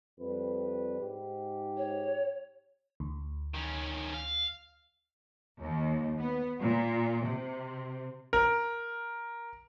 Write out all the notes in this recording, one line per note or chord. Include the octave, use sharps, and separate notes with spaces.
F2 G3 B4
G#2 G4
C#5
D2
D#3 C#4
F5
D#2
B3
A#2
C3
A#4